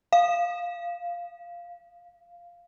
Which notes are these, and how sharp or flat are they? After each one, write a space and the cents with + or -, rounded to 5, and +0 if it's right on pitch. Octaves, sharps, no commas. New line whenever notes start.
F5 -5